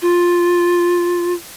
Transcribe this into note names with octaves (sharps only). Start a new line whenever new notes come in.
F4